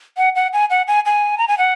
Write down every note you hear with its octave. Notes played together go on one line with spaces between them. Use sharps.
F#5
F#5
G#5
F#5
G#5
G#5
A#5
G#5
F#5